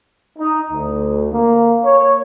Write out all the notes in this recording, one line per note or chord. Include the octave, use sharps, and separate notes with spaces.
D#4
D2
A#3
C#5